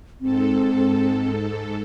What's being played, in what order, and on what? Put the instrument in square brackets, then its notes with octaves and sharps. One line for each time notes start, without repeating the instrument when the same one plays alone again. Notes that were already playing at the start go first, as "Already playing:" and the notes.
[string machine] G#2 A4 [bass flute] C4